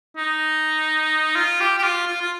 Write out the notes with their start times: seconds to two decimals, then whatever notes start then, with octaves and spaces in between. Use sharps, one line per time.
0.17 D#4
1.36 F4
1.60 G4
1.78 G4
1.83 F4
2.07 F4
2.21 F4